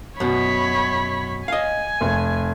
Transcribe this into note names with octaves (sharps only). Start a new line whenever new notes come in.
F#2 B2 C#5 B5
D#5 F5 G#5
F1